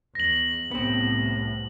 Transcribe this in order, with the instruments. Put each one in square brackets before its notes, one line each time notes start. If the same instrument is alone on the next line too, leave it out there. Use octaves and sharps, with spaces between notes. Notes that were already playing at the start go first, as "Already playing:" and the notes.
[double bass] E2 [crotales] A#6 F#7
[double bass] C2 A2 [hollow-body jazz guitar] B3 C4